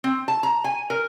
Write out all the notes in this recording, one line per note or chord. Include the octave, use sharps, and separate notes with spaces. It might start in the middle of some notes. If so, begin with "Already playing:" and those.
C4
A5
A#5
G#5
A#4